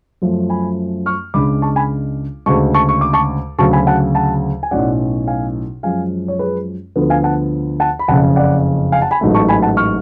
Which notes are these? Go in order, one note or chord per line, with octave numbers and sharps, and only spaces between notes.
F#2 F3 A3 C#4
G#5 B5
C#6 F6
C#2 C#3 G#3 D4 B5 D6
A5 C#6
G#5 B5
D2 C#3 G#3 A5 C#6
A5 C#6
C#6
D6
A5 C#6
D2 C#3 F#3 A5 C#6
G#5 B5
F#5 A5
F#5 A5
G#5
B1 A2 F#3 C#4 D5 F#5
F5 G#5
F#2 F3 G#3 C#4 F5 G#5
C#5
G#4 B4
D2 D3 F3 B3 A4
F5 G#5
F#5 A5
F#5 A5
B5
F#1 F2 C#3 F#5 A5
D5 F#5
F5 G#5
F#5 A5
G#5 B5
A1 G#2 F#3 A3
A5 C#6
G#5 B5
F#5 A5
C#6 F6